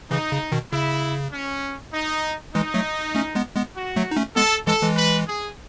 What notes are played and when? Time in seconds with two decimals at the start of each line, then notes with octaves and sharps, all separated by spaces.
0.11 C#3 E3 D#4
0.32 C#3
0.52 B2 D#3
0.72 C#3 E4
1.33 C#4
1.93 D#4
2.55 E3 G#3 D#4
2.74 F#3 A3
3.15 A3 C#4
3.35 G#3 B3
3.55 G#3 B3
3.76 F#4
3.96 F#3 A3
4.11 D#4
4.17 A3 C#4
4.36 G#3 B3 A4
4.67 E3 G#3 A4
4.82 E3 G#3
4.97 B4
5.28 G#4